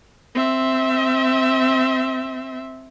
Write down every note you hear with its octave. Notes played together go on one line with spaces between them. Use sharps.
C4 E5